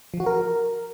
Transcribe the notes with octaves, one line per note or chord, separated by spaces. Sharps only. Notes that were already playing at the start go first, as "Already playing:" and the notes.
F3
F#4
A#4